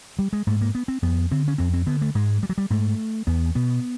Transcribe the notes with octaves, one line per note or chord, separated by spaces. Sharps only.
G3
G#3
G#2 A3
A#3
B3
C4
F2 B3
D3 C4
C#4
F2 C4
C4
D3 B3
A3
G#2 G#3
G3
F#3
G3
G#2 A3
E2 B3
B2 B3